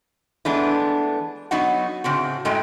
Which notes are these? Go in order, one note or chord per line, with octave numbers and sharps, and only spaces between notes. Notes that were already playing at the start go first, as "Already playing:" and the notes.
E3 G#3 A3 B3 D4
F#3 B3 D#4 F#4 F#5
A2 C#3 C4 F#4
F#2 A2 G#3 A3 G5